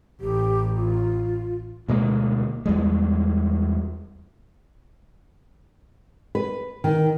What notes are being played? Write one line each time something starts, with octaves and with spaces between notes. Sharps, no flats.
A1 G4
F4
D2 B2 G#3 A#3
E2 G3 G#3
B4
D#3